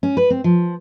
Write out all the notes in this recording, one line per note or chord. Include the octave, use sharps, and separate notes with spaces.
C#4
B4
C4
F3